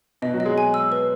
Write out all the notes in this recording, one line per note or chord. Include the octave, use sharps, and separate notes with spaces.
B2 B3 D#5
F#3 F#4
D#5
G#3 G#4
G#5
E6
B4